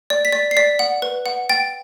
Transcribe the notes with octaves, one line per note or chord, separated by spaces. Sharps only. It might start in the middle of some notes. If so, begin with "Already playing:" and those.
D5
B6
D5
C7
D5 B6
F#5
B4
F#5
G5 A6